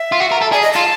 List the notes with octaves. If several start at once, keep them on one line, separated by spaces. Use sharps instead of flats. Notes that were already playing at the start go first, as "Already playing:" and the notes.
Already playing: E5
F4
F#4
A#4
A4
G#4 D5
D#5
F4 A5